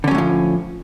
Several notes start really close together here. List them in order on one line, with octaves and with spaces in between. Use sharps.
D3 C#4 F#3 A2 F3